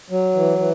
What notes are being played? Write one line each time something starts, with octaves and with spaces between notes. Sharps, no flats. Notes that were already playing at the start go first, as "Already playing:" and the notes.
F#3
E3
E3